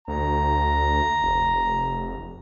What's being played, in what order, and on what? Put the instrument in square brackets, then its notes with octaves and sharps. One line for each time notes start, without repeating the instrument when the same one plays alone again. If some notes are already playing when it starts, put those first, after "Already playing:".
[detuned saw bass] D2 [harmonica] A#5
[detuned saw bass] F1